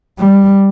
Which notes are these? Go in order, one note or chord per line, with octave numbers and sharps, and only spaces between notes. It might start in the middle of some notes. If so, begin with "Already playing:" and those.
G3